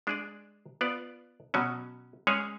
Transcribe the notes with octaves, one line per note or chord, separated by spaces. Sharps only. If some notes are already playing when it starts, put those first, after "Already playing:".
G#3 D4 G#4 D5
B3 F4 B4 D5
B2 F#3 C#4
G#3 C#4 G#4 C#5